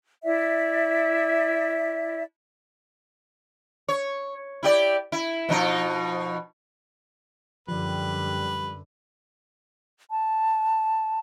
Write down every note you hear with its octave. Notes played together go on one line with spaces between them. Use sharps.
E4 D5 E5
C#5
E4 G4 D5
E4
B2 F3 D#4
F#2 D3 F3 G3 B4
A5